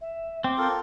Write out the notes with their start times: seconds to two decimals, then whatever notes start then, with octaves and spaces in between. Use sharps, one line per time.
0.01 E5
0.44 C4 G5 D6
0.58 F4 A4 A#4